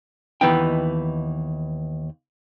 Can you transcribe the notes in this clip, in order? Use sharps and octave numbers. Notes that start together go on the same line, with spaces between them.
D#2 E3 B3 D#4 G5